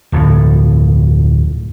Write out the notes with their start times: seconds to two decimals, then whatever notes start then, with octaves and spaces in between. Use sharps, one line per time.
0.12 D1 F2